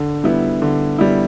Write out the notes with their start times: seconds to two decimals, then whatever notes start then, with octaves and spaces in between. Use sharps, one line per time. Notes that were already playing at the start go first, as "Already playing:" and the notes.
Already playing: D3
0.24 G3 B3 E4
0.62 D3
0.98 G3 B3 E4